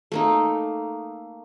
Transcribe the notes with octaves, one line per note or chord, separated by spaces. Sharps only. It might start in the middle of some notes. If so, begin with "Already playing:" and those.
A3 A#3 D#4